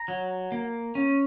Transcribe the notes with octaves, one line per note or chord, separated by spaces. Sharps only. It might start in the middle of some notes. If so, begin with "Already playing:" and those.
Already playing: A#5
F#3
A#3
C#4